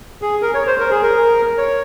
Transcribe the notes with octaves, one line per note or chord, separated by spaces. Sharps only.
G#4
A#4
C#5
C5
A#4
G#4
A#4
C#5